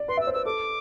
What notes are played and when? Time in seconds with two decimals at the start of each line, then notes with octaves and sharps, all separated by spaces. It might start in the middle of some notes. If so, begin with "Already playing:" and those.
Already playing: D5
0.08 B4 C6
0.17 E5 E6
0.27 C5
0.34 B4 E6
0.45 A4 D6